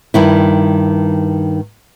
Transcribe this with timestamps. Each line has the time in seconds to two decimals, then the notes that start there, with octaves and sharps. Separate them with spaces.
0.14 G2 D#3 E4